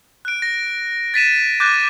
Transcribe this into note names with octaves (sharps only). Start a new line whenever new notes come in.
F#6 D7
A#6
A6 B6 D#7 E7
D6 F#6 G6 A6 A#6